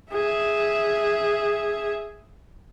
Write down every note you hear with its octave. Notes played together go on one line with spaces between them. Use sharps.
G#4 E5